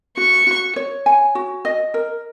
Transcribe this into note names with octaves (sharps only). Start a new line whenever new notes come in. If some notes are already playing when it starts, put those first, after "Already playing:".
F#4 C#6
F#4
C#5
G#5
F#4
D#5
A#4